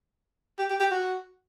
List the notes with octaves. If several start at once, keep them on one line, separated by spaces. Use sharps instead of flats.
G4
G4
G4
F#4